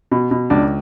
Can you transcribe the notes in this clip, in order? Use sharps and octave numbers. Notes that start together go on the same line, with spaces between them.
B2
B2
C#2 D4